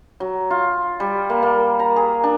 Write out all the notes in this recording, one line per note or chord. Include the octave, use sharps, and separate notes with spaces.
F#3
F4
G3
A#3
A#3
A#5
G#4
D4